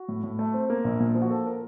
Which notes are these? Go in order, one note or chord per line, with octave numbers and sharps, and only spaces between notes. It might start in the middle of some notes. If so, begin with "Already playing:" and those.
Already playing: F#4
A2
A2
A3
C4
A#3
A#1
A#2
F3
F#4
A#3 A4
A#4